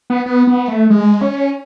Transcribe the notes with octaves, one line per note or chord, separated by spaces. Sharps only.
B3
B3
B3
A3
G#3
C#4